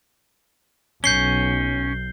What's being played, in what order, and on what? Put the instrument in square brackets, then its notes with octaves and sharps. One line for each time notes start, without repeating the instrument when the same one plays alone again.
[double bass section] B1 [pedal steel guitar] C#4 [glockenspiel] G6 C7 G7